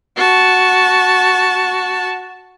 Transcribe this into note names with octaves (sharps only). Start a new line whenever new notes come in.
F#4 A5